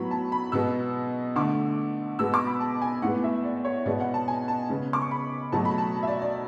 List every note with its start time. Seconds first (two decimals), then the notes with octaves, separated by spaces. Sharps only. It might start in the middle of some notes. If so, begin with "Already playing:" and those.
Already playing: A2 F#3 B3 B5
0.11 A5
0.32 B5
0.52 B2 G#3 B3 E6
1.36 D3 A3 D6
2.19 B2 G#3 B3 E6
2.34 D6
2.47 B5
2.60 A5
2.82 G#5
3.02 A2 G#3 B3 F#5
3.24 E5
3.44 D5
3.64 C#5
3.86 B2 G#3 B3 D5
4.00 F#5
4.14 A5
4.28 G#5
4.48 A5
4.69 C#3 G#3 B3
4.93 D6
5.01 C#6
5.11 B5
5.52 B2 F#3 A3 A5
5.65 B5
5.78 A5
6.03 E5
6.07 D5
6.22 D5